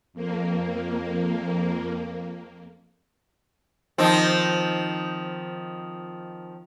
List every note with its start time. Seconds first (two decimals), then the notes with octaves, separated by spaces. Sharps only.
0.13 F2 A#3
3.98 D#3 F3 C4